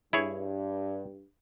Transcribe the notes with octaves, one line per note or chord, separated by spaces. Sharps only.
G2 E4 G#4 C#5